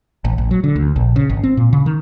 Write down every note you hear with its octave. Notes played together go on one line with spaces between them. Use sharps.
A1
A1
F#3
D3
D2
A#1
C#3
G#1
C4
A#2
C#3
D#3